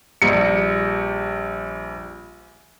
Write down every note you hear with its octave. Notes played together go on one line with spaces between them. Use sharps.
A#1 G3 C#7